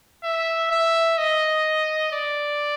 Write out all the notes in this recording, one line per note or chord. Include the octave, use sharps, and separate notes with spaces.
E5
E5
D#5
D5